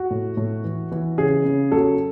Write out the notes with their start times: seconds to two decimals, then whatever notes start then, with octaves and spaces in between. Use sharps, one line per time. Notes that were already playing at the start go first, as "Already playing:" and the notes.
Already playing: F#4
0.10 A2
0.37 A2
0.64 E3
0.92 E3
1.18 C#3 G#4
1.45 C#3
1.72 F#3 A4